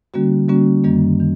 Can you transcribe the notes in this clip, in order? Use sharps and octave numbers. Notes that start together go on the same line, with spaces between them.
D3 G3 A#3 C#4 F#4
D3 G3 A#3 C#4 F#4
F#2 D#3 G3 A#3
D#3